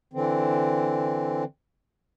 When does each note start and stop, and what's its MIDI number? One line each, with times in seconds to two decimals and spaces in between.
0.13 1.44 50
0.13 1.44 52
0.13 1.44 60